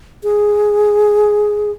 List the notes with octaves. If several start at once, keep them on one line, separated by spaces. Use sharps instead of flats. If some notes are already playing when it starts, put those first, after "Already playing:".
G#4